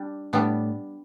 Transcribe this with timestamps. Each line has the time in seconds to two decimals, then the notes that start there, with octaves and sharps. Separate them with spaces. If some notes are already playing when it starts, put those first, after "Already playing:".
Already playing: G3 D4
0.33 A2 G3 B3 D4